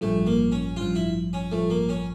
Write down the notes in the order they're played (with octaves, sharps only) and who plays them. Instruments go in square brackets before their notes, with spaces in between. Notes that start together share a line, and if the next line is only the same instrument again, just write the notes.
[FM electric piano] A1 G2 F3 [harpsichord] A3
[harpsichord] A#3
C#4
[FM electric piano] A1 G2 F3 [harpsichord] F4
[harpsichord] E4
C#4
[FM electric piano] A1 G2 F3 [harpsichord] A3
[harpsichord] A#3
C#4